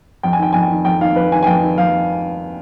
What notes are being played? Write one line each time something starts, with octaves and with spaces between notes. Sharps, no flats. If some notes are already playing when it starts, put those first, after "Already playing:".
F2 G5
G#5
D#3 G5
F2 G#5
G5
D#3
F2 G5
D#3 F5
F2 B4
D#3 G#5
G#5
F2 G5
D#3
F2 F5